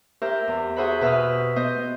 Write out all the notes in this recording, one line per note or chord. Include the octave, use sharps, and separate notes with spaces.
G4 A#4 C5 E5
E2
F#4 G#4 C5 E5 F#5 B5
B2 B4 E5 B5 D#6 F6
B3 C5 D#5